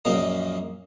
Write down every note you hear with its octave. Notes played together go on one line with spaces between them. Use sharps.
A#1 F#2 A#3 A#4 D#5